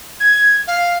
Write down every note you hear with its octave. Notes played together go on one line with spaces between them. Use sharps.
G#6
F5